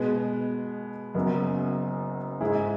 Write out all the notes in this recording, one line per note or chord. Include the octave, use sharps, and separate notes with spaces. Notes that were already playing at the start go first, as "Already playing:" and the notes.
Already playing: B2 G#3 B3
F#1 F#2 F#3 B3
G#2 G#3 E4 G#4